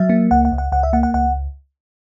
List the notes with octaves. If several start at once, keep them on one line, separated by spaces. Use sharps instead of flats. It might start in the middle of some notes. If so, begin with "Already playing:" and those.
Already playing: F#3 E5
A#3
C#2 F#5
F#5
C#2
F#5
C#2 F#5
E5
A#3 F#5
F#5
C#2 F#5